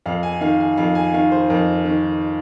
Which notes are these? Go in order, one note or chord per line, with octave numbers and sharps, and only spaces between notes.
F2 F5
G#5
D#3 F5
G#5
F2 F5
G#5
D#3 F5
C5
F2 A#4
D#3